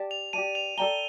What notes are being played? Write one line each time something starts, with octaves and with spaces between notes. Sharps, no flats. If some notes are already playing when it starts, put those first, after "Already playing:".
Already playing: G4 D5 A5
F7
G4 D5 A5 D#7
F7
A4 D5 G5 A#5 G7